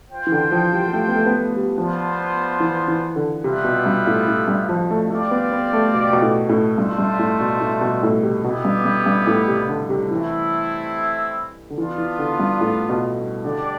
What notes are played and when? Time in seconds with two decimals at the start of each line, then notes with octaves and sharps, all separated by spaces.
0.10 F4 C5 G5
0.27 E3
0.32 D3
0.52 F3
0.73 G3
0.88 G3
0.93 A3
1.08 B3
1.15 A3
1.26 B3
1.36 A3
1.57 G3
1.78 F3 B3 D4 F4 C5
2.60 E3
2.88 E3
3.16 D3
3.44 C3 G3 B3 F4 B4 E5
3.64 B2
3.86 G2
4.07 A2
4.28 A2
4.48 G2
4.69 F3
4.90 A3
5.10 A3 C4 G4 D5 F5
5.31 B3
5.52 B3
5.73 A3
5.94 B2
6.13 B2
6.22 A2
6.49 A2
6.78 G2 A3 D4 F4 C5 E5
6.98 G2
7.19 A2
7.40 B2
7.60 A2
7.81 B2
8.03 A2
8.23 C3
8.44 B2 B3 E4 G4
8.65 G2
8.85 G2
9.06 G2
9.27 A2
9.48 C3
9.69 D3
9.90 C3
10.11 E3 A3 C4 E4
11.70 D3
11.78 E3 B3 D4 F4
11.98 E3
12.19 D3
12.40 G2
12.61 A2
12.89 B2
13.44 D3 D4 G4 D5